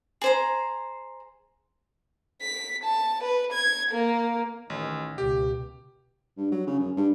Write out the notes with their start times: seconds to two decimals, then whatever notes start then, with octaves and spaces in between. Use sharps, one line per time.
0.22 G#4 C5 A#5
2.42 B6
2.84 A5
3.23 B4
3.53 G#6
3.91 A#3
4.70 A1 D#3
5.18 C#2 B2 G4
6.37 G2
6.52 F#3
6.67 C#3
6.79 F#2
6.97 G2